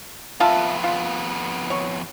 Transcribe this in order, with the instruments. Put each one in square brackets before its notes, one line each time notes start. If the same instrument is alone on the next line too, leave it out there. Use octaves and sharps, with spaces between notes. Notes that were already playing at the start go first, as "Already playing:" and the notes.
[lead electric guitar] F2 B3 [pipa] F4 E5 A5
[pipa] F4
C#5